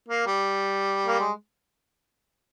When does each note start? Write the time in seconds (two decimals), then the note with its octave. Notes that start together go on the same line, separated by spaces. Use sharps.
0.08 A#3
0.26 G3
1.07 A#3
1.19 G#3